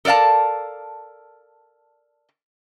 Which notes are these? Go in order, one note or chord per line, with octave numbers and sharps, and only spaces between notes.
A4 A#4 D5 F5 A5